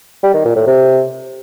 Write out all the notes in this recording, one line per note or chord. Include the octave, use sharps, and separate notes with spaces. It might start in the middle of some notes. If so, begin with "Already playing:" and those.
G3
D#3
A#2
A2
C3